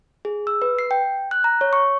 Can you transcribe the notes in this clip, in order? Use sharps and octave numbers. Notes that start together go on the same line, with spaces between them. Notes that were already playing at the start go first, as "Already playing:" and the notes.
G#4
E6
B4
C7
G5
F#6
A#5
C#5
C#6